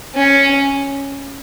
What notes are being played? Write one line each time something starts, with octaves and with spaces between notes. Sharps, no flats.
C#4